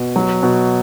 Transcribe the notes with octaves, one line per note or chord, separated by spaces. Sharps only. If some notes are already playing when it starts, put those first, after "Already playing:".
Already playing: B2
F#3
B2